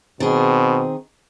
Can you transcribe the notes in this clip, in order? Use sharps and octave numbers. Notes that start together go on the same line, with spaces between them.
B2 D#3 C4 G#4